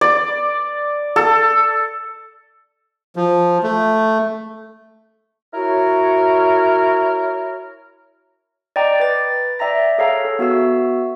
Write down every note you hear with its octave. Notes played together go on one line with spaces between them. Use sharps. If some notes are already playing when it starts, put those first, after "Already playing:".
D5
A4
F3
A3
E4 F#4 A#4 C#5
D5 D#5 G5 A#5 D6
B4 A6
D5 E5 G5 A#5 A#6
G#4 A4 C#5 F5 G5 A#5
A4
B3 F#4 E5 E6